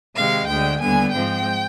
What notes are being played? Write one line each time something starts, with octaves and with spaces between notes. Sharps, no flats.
C3 D#3 G#3 F5
D2 D3 G#3 G5
D#2 D3 G3 B3 G#5
G#2 F3 G#3 C4 G5